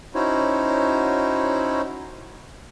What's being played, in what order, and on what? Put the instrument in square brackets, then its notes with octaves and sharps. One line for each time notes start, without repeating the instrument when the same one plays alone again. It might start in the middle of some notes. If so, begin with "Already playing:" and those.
[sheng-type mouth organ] C#4 D#4 E4 F#4 C5 C#5